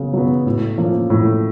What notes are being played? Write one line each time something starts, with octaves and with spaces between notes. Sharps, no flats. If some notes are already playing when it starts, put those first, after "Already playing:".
Already playing: C#3 F#3 B3
F#3 B3
A2
F3 A#3 C#4
A2